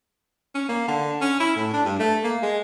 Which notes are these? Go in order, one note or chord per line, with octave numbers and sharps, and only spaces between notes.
C#4
A#3
D3
C#4
E4
A2
D4
G2
A3
A#3
G#3